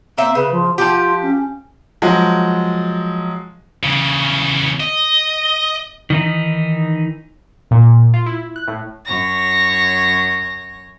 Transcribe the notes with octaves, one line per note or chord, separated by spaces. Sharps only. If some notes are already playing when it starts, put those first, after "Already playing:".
A#3 C4 E5
C#3 B4
F3
F3 F4 G4
C#4
F3 F#3 G#3
C#3 E3
D#5
D#3 E3 D#4
A#2
F4
E4
F#6
A2
F#2 C#5 A#6